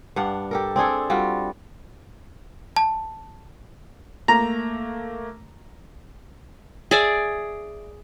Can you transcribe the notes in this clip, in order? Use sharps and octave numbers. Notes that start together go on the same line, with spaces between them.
G2 D4 F5 F#5
G4 A4 A#4
C4 D4 G#4 A4
G3 F4 F#4
A5
A3 A#3 A#5
G#4 D5 E5